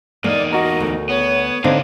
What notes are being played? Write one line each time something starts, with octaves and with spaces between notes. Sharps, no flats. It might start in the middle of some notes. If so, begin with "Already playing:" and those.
E2 A#3 D#4 D5
F#4 A#4 D#5
D2
B3 C#5
D3 B3 C4 D4 D#4 F5